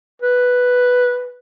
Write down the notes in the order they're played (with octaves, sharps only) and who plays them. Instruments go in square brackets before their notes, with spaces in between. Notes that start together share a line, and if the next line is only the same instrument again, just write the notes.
[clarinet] B4